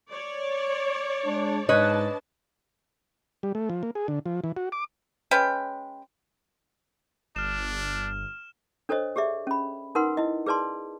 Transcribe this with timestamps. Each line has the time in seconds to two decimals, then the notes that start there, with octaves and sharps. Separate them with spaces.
0.11 C#5 D5
1.26 G#3 D4
1.69 G#2 D4 B4 C#5 D#5 A5
3.43 G3
3.55 A3
3.70 F3
3.83 A#3
3.95 G#4
4.08 D3
4.26 F3
4.44 E3
4.56 F#4
4.72 D6
5.31 G#3 C#4 B4 G5
7.36 G1 D4 F6 E7
8.89 D4 A4 C5 C#5 D#5
9.16 G4 G#4 D5 E5
9.47 C#4 B5
9.95 D#4 A#4 B4 F#5 C6
10.17 E4 D#5
10.46 G#4 B4 D5 A5 C6